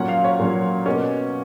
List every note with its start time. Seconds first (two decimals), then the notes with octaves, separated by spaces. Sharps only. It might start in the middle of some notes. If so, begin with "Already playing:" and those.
Already playing: A#2 F#3 C#4 F#5
0.08 F5
0.24 C#5
0.39 A#2 F#3 C#4
0.86 B2 A#3 C#4